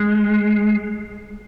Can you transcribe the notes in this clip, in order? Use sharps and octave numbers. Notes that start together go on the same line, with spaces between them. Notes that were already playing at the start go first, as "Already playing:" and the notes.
Already playing: G#3